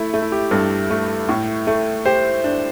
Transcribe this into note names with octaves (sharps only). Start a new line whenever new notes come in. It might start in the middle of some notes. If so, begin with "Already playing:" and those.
Already playing: A3 E4
A3
E4
G4
G2 A4
A3
A2
A3
G4 C5
D4